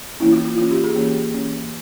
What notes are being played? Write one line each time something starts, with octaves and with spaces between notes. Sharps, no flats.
E3 A#3 C#4 E4
F4
F4
E3 A#3 C#4 F4
G4
G#4
E3 A#3 C#4
E3 A#3 C#4